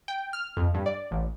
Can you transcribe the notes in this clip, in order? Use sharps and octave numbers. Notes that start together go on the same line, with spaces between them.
G5
F6
F2
G2
D5
A1